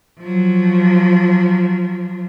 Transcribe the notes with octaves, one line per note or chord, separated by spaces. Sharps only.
F3 F#3